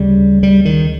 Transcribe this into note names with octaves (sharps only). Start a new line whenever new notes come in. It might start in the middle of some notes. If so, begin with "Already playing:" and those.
Already playing: D2 C#3 G3
G3
D#3